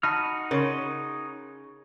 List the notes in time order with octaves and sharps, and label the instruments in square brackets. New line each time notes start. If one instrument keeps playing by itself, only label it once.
[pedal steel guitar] D#4 F#4 F6 [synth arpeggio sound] A5 B5
[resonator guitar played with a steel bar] C#3 [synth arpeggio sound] A#4 C#5 C6